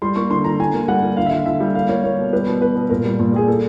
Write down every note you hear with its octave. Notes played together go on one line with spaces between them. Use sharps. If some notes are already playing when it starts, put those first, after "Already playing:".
G3 C6
A#3 C#6
D3 C6
D3 A#5
D3 G#5
A#3
G3 F#5
A#3
D3 F5
E5
D3
F5
D3 E5
G3
A#3 F5
A#3 C#5
A#3 C#5
B2
G3 B4
B2
B2 B4
B2
A#2 A#4
G3
A#2
G3 G#4
A#3 A4